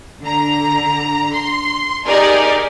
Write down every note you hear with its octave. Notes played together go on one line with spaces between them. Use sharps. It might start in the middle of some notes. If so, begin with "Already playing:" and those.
D3 A#5
C6
D#4 G4 G#4 A#4 D5 G#5